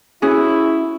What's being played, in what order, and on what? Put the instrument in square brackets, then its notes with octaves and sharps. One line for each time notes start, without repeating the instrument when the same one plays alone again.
[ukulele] C#4 F#4 G#4 [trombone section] E4